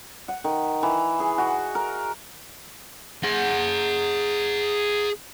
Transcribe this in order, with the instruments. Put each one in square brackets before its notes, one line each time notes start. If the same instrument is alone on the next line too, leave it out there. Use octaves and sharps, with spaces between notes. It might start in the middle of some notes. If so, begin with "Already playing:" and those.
[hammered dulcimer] F#5
D#3
E3
G#4
F#4
A#4
[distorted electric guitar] G#4 F#5